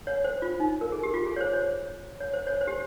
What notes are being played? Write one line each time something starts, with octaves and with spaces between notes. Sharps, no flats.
C#5
C5
F4
D#4
A#4
G#4
G4
F4
G#4
C#5
C5
C#5
C#5
C5
C#5
C5
G4